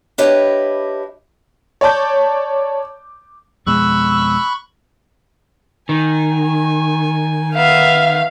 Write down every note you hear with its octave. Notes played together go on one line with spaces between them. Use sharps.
D4 E4 G4 B4 C#5 D#5
C#5 D5 A5 D6 G6
F2 B2 G#3 B5 C#6 E6 F#6
D#3 G#5
B3 E5 F5